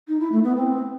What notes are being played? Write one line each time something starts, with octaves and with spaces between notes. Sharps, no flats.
D#4
E4
A3
B3
C4